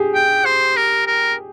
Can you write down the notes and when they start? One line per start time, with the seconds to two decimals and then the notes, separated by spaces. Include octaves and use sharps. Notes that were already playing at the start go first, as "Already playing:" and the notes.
Already playing: G4 G#4
0.15 G5
0.45 C5
0.76 A#4
1.07 A#4